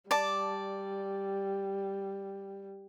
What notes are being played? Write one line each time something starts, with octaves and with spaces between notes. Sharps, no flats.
G3 D5 A5